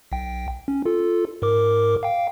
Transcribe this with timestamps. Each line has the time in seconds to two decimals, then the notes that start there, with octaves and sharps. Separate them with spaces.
0.12 B1 G5
0.68 C#4
0.85 F4 A4
1.42 G#2 A#4 D6
2.03 F5 G5